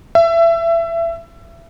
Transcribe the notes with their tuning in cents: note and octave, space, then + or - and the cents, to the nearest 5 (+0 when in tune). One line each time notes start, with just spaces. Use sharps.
E5 +25